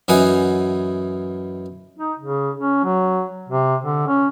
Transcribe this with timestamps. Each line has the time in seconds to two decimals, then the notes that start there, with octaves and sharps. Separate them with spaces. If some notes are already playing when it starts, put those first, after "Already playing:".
0.08 F#2 E3 D#4 F#5 G#5
1.99 D#4
2.20 C#3
2.57 C#4
2.84 F#3
3.49 C3
3.81 D3
4.07 C#4